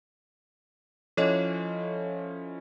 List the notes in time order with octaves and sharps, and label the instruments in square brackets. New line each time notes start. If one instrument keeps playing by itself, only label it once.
[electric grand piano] F3 C#4 E4 [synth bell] A4 C#5 D#5